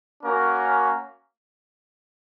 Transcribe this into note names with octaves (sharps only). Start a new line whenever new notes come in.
A#3 C#4 F#4 A#4